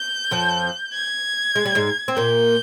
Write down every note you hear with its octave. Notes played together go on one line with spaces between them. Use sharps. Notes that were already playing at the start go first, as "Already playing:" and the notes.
Already playing: G6
F2 F3
G#6
G#3
G3
G#2 G#3
C4
A#2 A#3 G6